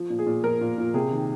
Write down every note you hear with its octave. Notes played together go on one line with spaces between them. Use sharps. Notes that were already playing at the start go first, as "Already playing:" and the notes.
Already playing: F3
A#2
G#4
A#2
F3 A#4
A#2
A#2
C3 G#4
D#3